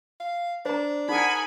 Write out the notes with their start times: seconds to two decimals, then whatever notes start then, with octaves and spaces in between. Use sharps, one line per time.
0.20 F5
0.66 D4 C5 A#5
1.09 D#4 G#4 A#4 F#5 G#5 B5